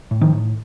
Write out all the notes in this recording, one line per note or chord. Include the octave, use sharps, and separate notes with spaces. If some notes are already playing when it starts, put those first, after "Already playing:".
A2
D#3 F3
A2